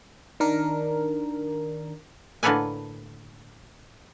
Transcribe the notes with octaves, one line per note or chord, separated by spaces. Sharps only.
D#3 D4 A#4
A2 D3 A#3 A4 B4 G#5